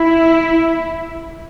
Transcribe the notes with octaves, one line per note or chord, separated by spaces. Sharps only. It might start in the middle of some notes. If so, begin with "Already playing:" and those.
Already playing: E4